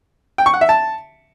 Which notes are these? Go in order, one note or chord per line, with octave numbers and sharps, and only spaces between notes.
G5
C#6
F#5
E5
A5